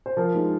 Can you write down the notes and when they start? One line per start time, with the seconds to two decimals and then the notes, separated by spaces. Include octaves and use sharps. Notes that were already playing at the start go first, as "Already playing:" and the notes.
0.06 C5
0.17 F3 A#4
0.35 G#3 D#4